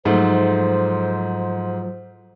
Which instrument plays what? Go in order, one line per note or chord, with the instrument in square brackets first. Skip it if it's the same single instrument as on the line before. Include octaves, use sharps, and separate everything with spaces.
[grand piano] G#2 [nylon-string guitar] F3 F#3 A3 [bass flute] C5